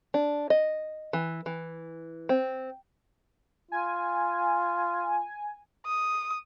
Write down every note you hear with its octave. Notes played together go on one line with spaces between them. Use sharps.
D4
D#5
E3
E3
C4
F4 G#5
D#6